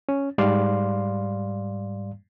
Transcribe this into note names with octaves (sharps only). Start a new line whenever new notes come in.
C#4
G#2 G3 D5 F5 C6